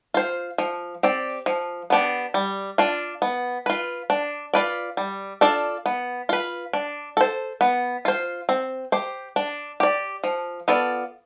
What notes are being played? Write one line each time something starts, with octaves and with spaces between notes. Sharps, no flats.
F4 C5
F3
C4 G4 D5
F3
B3 D4 G4
G3
D4 F4
B3
F4 B4
D4
F4 B4 D5
G3
D4 F4 A4 D5
B3
F4 B4
D4
A4 C5
B3
F4 C5
C4
G4 C5
D4
G4 D5
F3
B3 F4 A4 D5